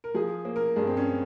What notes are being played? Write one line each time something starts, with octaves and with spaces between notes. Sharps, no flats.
A#4
F3 G#4
A#3
A#4
G2 G#4
C4
C#4